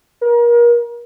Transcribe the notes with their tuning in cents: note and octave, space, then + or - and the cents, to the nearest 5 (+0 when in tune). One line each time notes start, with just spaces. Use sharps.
A#4 +35